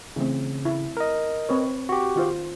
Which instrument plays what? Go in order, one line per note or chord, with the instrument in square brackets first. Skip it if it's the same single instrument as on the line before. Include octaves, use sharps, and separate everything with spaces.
[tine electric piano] C#3 [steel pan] E3 A3 C4
[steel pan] E4
[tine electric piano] A#4 D#5
[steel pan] C4 B4 C#5
[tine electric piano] F#4 G4
[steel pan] D#3 F4 C5